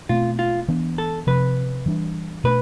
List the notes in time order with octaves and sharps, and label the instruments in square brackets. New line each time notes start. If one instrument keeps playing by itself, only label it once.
[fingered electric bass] B2 A3 C4 [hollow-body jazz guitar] F4
[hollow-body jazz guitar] F4
[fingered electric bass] E3 B3 D4
[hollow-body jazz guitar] A4
[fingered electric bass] C3 F3 C4 [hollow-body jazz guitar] B4
[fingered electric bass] E3 G3 D4
[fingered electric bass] B2 A3 D4 [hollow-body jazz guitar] B4